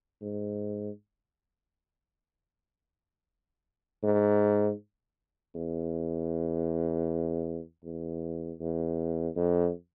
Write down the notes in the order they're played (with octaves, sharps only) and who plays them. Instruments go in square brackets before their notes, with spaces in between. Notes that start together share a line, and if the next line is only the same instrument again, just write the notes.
[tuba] G#2
G#2
E2
E2
E2
F2